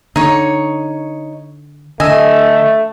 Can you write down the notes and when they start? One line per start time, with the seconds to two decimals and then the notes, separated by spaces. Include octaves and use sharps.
0.16 D3 D#4 C#5
2.00 D3 A3 D#5 G#5 E6